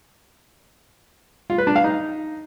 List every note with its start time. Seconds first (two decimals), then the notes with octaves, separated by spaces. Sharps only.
1.50 F4
1.58 B4
1.67 D4
1.76 F5
1.84 D#4